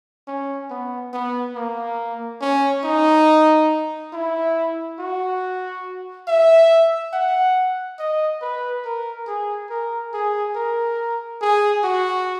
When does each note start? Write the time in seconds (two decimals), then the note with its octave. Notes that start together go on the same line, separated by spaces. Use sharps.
0.28 C#4
0.70 B3
1.13 B3
1.56 A#3
2.41 C#4
2.84 D#4
4.13 E4
4.99 F#4
6.28 E5
7.13 F#5
7.99 D#5
8.42 B4
8.85 A#4
9.27 G#4
9.70 A#4
10.14 G#4
10.55 A#4
11.41 G#4
11.84 F#4